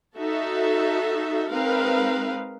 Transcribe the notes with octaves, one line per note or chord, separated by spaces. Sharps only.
D#4 F#4 A4 E5
G#3 C4 D#4 A#4 B4 F5